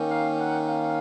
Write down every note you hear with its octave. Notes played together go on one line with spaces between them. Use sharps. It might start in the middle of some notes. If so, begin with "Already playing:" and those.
Already playing: D#3 A#3 C#4
F5
F#5
F5